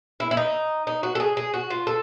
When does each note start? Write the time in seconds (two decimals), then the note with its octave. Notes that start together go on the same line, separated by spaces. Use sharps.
0.20 E4
0.31 E4
0.37 D#4
0.87 D#4
1.03 F#4
1.15 A4
1.20 G#4
1.37 G#4
1.54 F#4
1.70 F4
1.87 A4